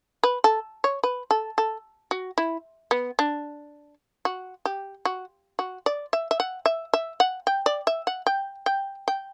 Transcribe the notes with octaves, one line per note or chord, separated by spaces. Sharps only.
B4
A4
C#5
B4
A4
A4
F#4
E4
B3
D4
F#4
G4
F#4
F#4
D5
E5
E5
F#5
E5
E5
F#5
G5
D5
E5
F#5
G5
G5
G5